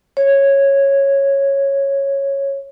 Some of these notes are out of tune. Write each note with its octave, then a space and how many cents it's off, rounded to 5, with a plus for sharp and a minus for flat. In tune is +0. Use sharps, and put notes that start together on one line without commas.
C#5 -10